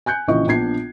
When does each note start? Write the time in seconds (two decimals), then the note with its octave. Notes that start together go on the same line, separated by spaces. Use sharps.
0.06 G#5 F#6 G6 C#7
0.28 A#1 C#3 E3 D#5 C#6
0.47 A#1 B3 D4 G#6 C7